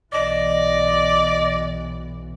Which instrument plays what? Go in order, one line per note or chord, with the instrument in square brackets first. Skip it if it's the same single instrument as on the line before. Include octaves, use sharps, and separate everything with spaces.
[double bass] B1 E3 [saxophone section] D5 [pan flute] D#5